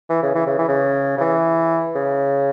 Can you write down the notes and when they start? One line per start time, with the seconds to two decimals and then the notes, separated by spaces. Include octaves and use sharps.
0.10 E3
0.23 C#3
0.35 E3
0.47 C#3
0.59 E3
0.68 C#3
1.18 C#3
1.21 E3
1.95 C#3